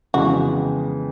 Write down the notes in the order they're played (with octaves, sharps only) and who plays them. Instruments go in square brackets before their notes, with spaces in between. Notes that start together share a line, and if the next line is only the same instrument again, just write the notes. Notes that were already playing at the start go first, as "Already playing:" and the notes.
[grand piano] F2 C#3 E3 G#3 B3 [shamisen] F#4